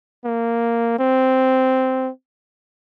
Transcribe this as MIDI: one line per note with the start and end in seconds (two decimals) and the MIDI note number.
0.25 0.98 58
0.99 2.10 60